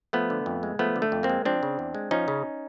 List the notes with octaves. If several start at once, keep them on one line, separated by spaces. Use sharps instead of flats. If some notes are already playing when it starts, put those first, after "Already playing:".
F3 A3 B3
D3
F2
G#3
F3 A3 B3
D3
A3
F2
A#3 C4
G#3
F3 C4 D4
C#3
E2
G#3
F3 C#4 D#4
C#3